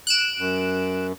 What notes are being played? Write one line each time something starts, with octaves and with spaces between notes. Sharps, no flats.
F#6 D7 E7
F#2